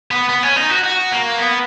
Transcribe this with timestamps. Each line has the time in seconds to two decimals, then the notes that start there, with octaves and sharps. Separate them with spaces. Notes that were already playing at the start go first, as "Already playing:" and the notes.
0.11 B3
0.29 B3
0.43 C#4
0.56 D#4
0.70 F#4
0.84 F#4
1.11 A#3
1.38 B3